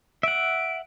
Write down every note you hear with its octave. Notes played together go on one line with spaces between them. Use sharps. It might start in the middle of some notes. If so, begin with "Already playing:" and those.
E5 F#5 D7